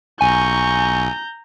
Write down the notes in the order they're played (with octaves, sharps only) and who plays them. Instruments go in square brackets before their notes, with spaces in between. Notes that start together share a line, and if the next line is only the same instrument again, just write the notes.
[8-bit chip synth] B1 [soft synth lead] G#5 [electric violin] A#5 G6 [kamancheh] C#6